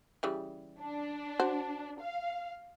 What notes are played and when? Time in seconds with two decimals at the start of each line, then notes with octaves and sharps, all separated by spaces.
0.23 C#3 E3 G3
0.80 D4
1.40 F#4 C5
2.00 F5